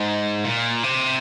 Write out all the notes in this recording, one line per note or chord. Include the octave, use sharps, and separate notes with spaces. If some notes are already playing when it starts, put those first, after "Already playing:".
Already playing: G#2
A#2
C3